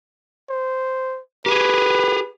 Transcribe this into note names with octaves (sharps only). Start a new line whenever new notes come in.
C5
G4 G#4 B4